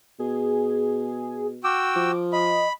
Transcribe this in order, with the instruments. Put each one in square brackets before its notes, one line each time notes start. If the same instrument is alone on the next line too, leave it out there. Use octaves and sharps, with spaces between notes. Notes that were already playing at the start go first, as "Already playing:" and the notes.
[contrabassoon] B2 [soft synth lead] G#4
[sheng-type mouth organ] F#4 G5 E6 [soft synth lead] D6
[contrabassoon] F3
[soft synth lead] D#5 [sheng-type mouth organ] B5